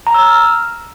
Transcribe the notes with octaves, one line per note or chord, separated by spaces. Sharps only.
A#5
E6
F6